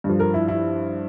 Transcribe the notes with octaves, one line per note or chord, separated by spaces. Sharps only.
G2
F3
A#4
E4
E4